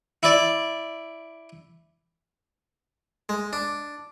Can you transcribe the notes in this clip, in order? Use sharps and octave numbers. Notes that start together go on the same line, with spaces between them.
E4 D5
G#3
D4